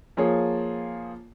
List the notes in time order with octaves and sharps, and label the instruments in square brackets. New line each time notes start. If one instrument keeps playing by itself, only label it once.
[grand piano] F3 A#3 F4 G#4 C#5